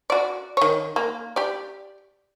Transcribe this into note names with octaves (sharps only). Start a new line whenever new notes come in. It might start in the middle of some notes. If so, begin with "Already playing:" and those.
F#4 D5
D#3 C#5
A#3
G4 D5